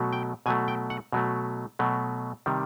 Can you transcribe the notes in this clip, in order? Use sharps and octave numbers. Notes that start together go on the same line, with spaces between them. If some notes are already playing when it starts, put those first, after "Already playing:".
Already playing: B2 F#3 A3
G5
B2 F#3 A3 G#5
G5
F#5
B2 F#3 A3
B2 F#3 A3
C3 D#3 G3